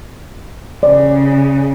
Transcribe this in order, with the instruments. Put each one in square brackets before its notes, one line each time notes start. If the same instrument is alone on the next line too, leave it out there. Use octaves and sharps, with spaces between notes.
[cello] C#3 [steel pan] D5